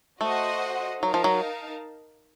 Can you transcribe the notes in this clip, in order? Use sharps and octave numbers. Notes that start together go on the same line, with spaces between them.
A3 F#4 C5 D#5 F#5
F#3 D#4 A#4 F5 A5
F3
F#3